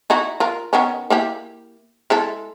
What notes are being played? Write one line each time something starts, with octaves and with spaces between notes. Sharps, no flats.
D#4 E4 F#4
F4 A#4
D#3 B3 C#4
A#3 E4 G4
G#3 E4 A4